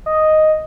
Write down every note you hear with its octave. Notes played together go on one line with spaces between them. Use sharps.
D#5